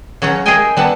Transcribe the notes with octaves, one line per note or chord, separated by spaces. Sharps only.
C#3 F#3 C#4 F#5 A#5
G#4 A#4 D#5 E5 G5 G#5
G3 B3 E5 F#5 A5